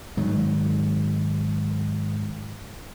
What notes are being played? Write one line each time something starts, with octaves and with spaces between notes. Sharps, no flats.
G#2 D#3 F#3